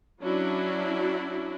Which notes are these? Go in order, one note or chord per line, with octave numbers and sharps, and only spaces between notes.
F#3 C#4 D4 E4 F#4